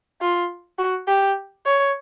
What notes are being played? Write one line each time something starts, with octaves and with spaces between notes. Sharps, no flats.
F4
F#4
G4
C#5